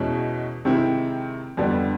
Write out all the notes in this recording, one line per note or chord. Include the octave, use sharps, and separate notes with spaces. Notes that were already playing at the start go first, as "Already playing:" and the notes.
Already playing: E2 B2 G#3 C#4 E4
C3 D#3 G#3 C4 E4
F2 D3 G3 B3 D4